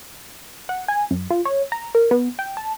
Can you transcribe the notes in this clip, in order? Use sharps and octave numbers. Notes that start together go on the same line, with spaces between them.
F#5
G#5
F#2
F4
C#5
A#5
A#4
B3
G5
A5